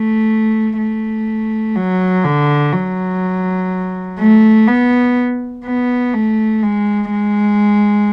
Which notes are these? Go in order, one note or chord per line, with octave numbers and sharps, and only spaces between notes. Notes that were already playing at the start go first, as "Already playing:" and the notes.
Already playing: A3
A3
F#3
D3
F#3
A3
B3
B3
A3
G#3
G#3